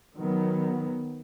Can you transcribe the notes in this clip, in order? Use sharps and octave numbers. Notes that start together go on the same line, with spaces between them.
D#3 F#3 B3